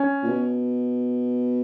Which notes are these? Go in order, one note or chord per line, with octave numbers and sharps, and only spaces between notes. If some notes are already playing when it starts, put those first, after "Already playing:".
Already playing: C#4
A#2
B2